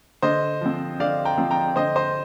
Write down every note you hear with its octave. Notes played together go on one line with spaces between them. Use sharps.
D3 C5 D#5
F3 C4
D3 D5 F5
G5 A#5
F3 C4
G5 A#5
D3 C5 D#5
C5 D#5